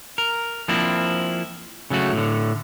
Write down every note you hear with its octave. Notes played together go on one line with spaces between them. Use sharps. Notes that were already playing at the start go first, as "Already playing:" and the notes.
A#4
F3 A#3 C4 D4 E4
C#3 F#3 A3 F#4
A2 D3